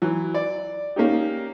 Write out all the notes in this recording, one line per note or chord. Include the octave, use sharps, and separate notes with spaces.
E3 F#3
D5
A#3 C#4 D#4 G4